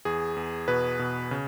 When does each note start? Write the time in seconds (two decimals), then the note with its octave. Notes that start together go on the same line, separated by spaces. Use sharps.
0.05 E2 G#4
0.37 E2
0.68 B2 B4
0.99 B2
1.31 C#3